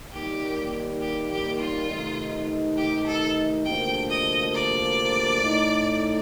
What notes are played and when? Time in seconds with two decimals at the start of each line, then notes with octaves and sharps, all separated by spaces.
0.13 D#2 D#3 G3 A#3 G4
1.01 G4
1.31 G4
1.59 F4
1.89 C3 D#3 A3 D#4
2.77 G4
3.07 A4
3.65 D2 C3 F3 A#3 D4 G5
4.10 D#5
4.54 D5
5.42 A2 A3 D#4